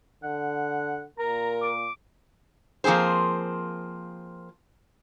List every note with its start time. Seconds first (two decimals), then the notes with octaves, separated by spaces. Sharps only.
0.23 D3 F#5
1.19 A#2 A#4 A#5
1.62 D6
2.84 F3 A#3 C4 G#4 C5